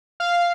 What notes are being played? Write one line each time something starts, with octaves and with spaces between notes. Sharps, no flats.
F5